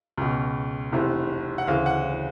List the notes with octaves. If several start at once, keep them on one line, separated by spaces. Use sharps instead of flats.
C#2 B2
F1 E2 C3
F#5
D2 C#3 E3 F5
F#5